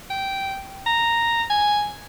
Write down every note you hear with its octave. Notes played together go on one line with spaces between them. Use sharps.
G5
A#5
G#5